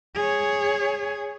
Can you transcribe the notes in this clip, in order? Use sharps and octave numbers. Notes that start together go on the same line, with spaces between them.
G#4 C#5